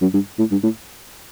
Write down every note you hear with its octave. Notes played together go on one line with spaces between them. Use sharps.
F#2
G2
A2
G2
A2